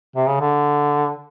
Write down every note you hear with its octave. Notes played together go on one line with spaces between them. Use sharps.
C3
C#3
D3